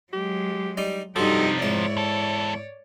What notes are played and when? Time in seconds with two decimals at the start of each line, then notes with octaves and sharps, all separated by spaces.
0.13 F#3 G#3 G4
0.77 G3 D#4 D5
1.16 G2 C3 F3 F#3 D#4 G4 A4
1.62 G#2 E4 C#5 D5 A5
1.97 E2 A4